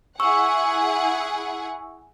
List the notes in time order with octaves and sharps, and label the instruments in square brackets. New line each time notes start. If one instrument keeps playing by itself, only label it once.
[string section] E4 G#4 F#5 [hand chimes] C#6 E6